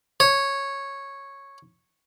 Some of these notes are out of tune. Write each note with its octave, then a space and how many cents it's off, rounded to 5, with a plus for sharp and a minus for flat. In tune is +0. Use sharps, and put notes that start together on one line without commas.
C#5 -5